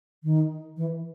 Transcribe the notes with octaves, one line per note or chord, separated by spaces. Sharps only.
D#3
E3